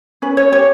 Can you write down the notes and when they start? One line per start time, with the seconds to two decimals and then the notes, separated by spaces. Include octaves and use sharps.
0.22 C#4 B4
0.37 C#5
0.52 G4 C#5